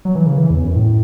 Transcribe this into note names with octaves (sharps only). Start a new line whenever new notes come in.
F#3
E3
C#3
E3
E2
F#2
A2